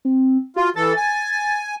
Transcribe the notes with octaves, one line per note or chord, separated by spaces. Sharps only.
C4
F4 F#4
E3 A4 A6
G#5